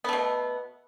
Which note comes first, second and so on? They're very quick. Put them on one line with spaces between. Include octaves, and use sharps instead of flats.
B3 A3 B2